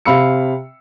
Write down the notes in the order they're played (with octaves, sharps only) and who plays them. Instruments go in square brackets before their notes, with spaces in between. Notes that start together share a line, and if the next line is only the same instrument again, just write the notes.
[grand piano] C3 F5 B5 E6 C#7